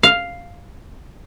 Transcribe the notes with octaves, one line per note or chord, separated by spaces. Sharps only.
F5